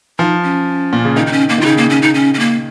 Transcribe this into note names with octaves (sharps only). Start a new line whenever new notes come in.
F3 D#4
C#4
A#2
C#3
D#3 D#4
D#4
C#4
A#3
D#3
F4
C#3 D#4
A#3
C#4
D#4
C#4
C#4
A#3